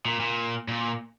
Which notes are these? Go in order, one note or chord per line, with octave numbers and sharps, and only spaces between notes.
A#2
A#2
A#2